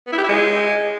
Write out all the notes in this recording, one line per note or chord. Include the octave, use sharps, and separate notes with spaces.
B3
E4
G4
E4
G#3